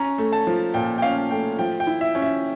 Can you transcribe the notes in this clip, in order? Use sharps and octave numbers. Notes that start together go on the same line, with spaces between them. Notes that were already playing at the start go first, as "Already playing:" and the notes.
Already playing: C#4 A#5
A3
A5
F3
A#2 G5
G5
C#4 F5
A3 G5
F3 G5
G5
E4
E5
C#4
E5